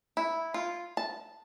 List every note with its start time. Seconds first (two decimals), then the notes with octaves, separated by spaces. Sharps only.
0.17 E4
0.54 F4
0.97 A5